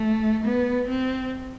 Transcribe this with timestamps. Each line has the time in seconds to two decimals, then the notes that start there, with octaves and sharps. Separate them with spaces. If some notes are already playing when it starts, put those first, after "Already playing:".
Already playing: A3
0.44 B3
0.88 C4